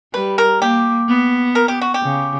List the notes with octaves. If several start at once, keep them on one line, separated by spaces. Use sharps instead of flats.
G3 B4
A#4
A#3 G4
B3
A#4
G4
F#4
G4
C#3